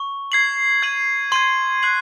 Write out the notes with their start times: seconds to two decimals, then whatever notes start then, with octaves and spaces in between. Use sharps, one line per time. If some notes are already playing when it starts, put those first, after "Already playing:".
Already playing: C#6
0.32 G#6 C7 F#7
0.82 G#6 D#7 F#7
1.32 C6 G#6 D#7 F#7
1.83 F#6 C7 F#7